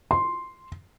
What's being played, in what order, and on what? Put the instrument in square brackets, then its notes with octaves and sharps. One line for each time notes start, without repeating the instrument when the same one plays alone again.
[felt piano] C6